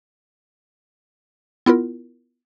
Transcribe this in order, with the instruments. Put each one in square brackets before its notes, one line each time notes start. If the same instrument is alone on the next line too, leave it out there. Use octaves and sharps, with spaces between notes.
[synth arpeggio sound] B3 E4 F4 A#4